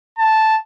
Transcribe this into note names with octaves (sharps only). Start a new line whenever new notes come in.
A5